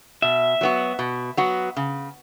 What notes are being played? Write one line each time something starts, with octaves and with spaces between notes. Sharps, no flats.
B2 E5
F#3 B3 F#4
B2
F#3 B3 F#4
C#3